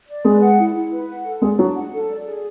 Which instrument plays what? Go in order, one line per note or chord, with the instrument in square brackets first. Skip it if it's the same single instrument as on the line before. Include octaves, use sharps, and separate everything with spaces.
[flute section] D5
[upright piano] G#3 G#4 [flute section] B4
[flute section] F#5
E4
E4
B4
F#5
A4
[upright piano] G#3 G#4 [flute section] D5
[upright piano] F#3 F#4 [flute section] D4
[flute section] F#5
A4
D5
G#4